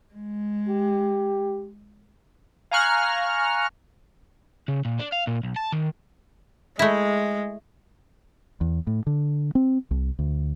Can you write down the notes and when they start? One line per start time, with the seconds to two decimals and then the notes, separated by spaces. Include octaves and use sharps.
0.15 G#3
0.69 G4
2.71 F5 G#5 A#5 C#6 F6 F#6
4.68 C#3
4.85 A#2
4.99 D4
5.12 F5
5.27 A#2
5.43 B1
5.56 A5
5.72 D#3
6.79 G#3 A3 E4
8.61 E2
8.87 A2
9.07 D3
9.55 C4
9.91 C2
10.19 D2